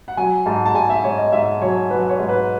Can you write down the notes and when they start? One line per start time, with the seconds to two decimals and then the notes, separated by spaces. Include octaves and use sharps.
0.08 F#5
0.17 F#3 G#5
0.46 G#2 A5
0.65 A5
0.74 G#2 G#5
0.89 E5
1.04 G#2 C#5
1.18 D#5
1.32 G#2 E5
1.61 F#3 C#5
1.90 F#3 B4
2.09 C#5
2.19 G#2
2.29 B4